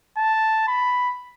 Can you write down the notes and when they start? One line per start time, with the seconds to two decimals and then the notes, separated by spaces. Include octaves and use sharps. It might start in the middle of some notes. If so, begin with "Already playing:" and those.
0.17 A5
0.67 B5